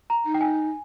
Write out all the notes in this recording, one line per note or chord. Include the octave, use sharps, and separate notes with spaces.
A#5
D#4
G5
G#5